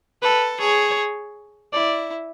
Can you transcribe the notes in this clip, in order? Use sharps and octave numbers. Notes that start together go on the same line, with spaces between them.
A4 B4
G#4 C#5
E4 D5